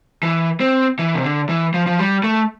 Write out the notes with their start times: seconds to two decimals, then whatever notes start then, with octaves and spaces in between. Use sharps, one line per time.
0.23 E3
0.60 C4
0.99 E3
1.15 C3
1.23 D3
1.49 E3
1.74 F3
1.87 F3
1.99 G3
2.24 A3